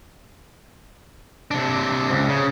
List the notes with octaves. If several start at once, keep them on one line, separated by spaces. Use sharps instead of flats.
C3 D4
C#2
C#3